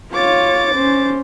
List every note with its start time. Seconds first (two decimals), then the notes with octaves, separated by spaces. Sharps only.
0.13 F4 C#5 D6 A6
0.75 C#4 C5